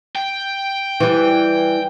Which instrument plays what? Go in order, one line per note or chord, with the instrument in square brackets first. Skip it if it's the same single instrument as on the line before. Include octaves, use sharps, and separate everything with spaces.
[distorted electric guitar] G5
[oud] E3 G3